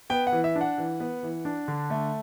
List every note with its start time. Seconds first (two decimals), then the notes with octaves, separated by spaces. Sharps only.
0.10 B3 G5
0.27 F#5
0.33 E3
0.44 E5
0.56 D4
0.61 F#5
0.78 E3
1.00 B3
1.23 E3
1.45 D4
1.68 D3
1.90 A3